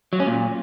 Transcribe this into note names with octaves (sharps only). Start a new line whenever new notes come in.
F#3
C#4
A#2